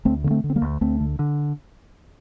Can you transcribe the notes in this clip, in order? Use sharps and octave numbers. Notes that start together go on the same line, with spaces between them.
D2 A3 C4
D3 A#3
A3 C4
D3
C4
G3 A#3
D2
D2 A3 C4
D3
D3